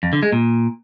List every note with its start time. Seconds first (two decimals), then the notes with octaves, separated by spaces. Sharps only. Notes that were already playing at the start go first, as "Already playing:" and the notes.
0.03 F2
0.13 D3
0.23 G#3
0.32 A#2